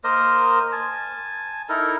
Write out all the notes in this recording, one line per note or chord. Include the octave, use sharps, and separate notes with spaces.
A#3 A#4 C5 D#5
G#5 A5
D#4 E4 A4 A#4